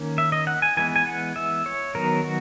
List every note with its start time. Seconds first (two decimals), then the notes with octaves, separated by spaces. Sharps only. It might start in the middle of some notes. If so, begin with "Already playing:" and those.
Already playing: D#3 A#3 C#4
0.18 E5
0.32 D#5
0.47 F#5
0.62 G#5
0.77 E3 G#3 B3 G#5
0.96 G#5
1.07 F#5
1.36 E5
1.66 C#5
1.95 D#3 F#3 B3 A#4
2.24 F#4